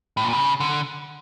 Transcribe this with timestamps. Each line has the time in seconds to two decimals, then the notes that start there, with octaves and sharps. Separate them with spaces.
0.17 A2
0.24 A#2
0.33 C#3
0.60 D3